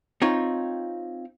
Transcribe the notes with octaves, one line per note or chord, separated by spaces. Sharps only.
C4 D#4 F4 C#5